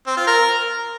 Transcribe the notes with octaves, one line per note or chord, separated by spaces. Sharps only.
C4
F4
A#4